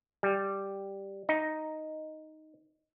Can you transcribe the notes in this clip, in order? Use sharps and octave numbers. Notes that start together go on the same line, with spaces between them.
G3
D#4